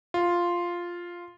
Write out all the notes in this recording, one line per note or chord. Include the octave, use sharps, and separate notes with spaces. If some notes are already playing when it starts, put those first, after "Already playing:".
F4